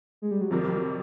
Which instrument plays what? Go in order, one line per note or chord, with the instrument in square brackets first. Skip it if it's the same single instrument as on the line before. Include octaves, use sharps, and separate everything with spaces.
[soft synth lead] G#3
G3
F#3
[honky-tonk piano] F2 C3 D#3 G3 [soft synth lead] F3
[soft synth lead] F#3